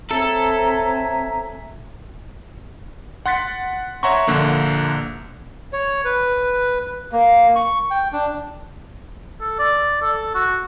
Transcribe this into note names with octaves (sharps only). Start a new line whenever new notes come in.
C4 A4 C#5 E5 G#5 A#5
F#5 C6 F#6 A6 B6 C#7
C#5 E5 F#5 A#5 C6 C#6
A#1 D3 A#3
C#5
B4
A#3
C#6
G5
D4
A4
D5
A4
F#4